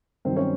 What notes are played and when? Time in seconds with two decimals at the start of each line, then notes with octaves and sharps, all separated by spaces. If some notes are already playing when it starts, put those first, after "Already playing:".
0.25 G2 D#3 F#3 C4 C5
0.36 C#4 C#5